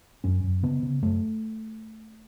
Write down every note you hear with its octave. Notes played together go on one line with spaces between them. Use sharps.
F#2 C#4
F#2
C#3 B3
C#3
F#2 A3